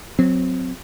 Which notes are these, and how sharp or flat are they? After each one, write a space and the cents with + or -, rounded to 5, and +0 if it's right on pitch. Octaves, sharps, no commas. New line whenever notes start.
F#3 -20 C4 -15